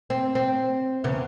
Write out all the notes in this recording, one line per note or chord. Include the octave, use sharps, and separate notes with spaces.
C4
C4
E2 C#3 B3